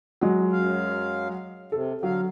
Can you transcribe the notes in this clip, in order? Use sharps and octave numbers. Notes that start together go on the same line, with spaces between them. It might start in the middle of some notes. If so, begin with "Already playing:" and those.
F#3 G#3
F#2 F5
C3 A4
D3 F#3 F5